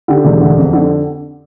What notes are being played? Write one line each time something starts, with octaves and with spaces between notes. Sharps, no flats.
D3 G4
E1
D2
F2
D3